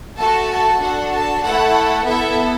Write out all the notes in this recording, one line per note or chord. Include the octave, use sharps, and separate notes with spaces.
A3 F#4 A4 A5
A5
D4 F#4 A4 F#5
A5
A3 E4 A4 F#5
B3 E4 A4 E5